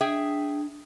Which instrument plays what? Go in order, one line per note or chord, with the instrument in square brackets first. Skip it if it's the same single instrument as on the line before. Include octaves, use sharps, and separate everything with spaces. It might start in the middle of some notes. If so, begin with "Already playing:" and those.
[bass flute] D4 [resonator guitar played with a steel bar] G#4 E5 G5